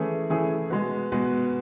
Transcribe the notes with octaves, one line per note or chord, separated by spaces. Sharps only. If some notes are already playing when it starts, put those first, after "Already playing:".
Already playing: E3 A3 C#4 E4 G#4
E3 A3 C#4 E4 G#4
B2 G#3 B3 F#4 B4
B2 G#3 B3 F#4 B4